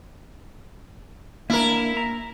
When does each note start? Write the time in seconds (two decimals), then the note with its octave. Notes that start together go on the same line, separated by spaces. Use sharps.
1.50 A#3 D4 E4 A#4
1.97 A#5